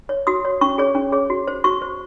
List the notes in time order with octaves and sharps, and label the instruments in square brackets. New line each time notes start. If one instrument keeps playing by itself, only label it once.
[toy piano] C#5
F#4 D#6
C#5
C#4 C#6
G#4 C#5
C#4
G#4 C#5
F#4
C5
F#4 C#6
C5